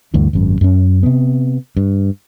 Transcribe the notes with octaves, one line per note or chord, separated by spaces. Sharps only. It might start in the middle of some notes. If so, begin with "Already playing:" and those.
D2 G2 E3
G#1 F#2
F#2 C#4
C3 B3
G2